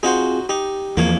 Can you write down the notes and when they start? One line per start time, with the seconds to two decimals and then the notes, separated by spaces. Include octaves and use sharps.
0.03 C4 D#4 F4 F#4 G#4 C5
0.49 D#4 G4
0.97 E2 F3 A#3 C#5